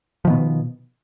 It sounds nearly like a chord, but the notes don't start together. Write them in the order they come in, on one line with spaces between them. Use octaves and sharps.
F3 D#3 B3 B2